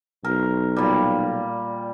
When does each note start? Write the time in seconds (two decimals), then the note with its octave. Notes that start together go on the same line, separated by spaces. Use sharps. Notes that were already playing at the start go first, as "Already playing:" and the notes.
0.24 B1 A#4
0.76 A#2 G3